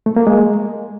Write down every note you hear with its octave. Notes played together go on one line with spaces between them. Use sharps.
A3
A#3
G#3